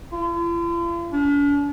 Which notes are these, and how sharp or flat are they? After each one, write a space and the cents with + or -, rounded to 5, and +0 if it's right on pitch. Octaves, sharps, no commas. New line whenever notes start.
F4 -45
D4 -45